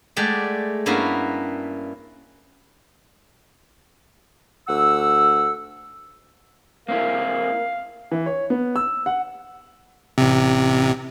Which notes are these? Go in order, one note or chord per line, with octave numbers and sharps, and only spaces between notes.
G#3 A3 G4 D5 F#5
G2 A#3 B3 C#4 E4 F#4
D2 F#5 E6
A#3 C4 E4 A#4 F5
E3
C#5
B3
E6
F#5
A1 C3